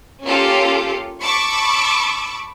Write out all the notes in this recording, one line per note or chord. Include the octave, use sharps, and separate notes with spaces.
A#3 C#4 F4 G4 A4
A5 B5 C#6 D6 E6